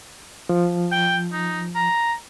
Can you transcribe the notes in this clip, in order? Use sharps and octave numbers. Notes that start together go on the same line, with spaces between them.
F3
G5
D#4
A#5